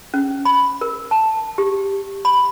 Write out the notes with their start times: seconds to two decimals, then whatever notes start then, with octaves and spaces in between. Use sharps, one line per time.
0.14 C#4
0.45 B5
0.81 A#4
1.11 A5
1.58 G4
2.25 B5